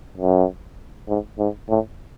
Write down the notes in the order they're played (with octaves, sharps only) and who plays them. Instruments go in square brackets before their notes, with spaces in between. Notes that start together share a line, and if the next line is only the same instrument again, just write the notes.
[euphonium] F#2
G#2
G#2
A2